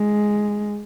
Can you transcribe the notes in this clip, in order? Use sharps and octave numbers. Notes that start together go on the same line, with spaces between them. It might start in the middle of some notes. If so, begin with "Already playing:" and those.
Already playing: G#3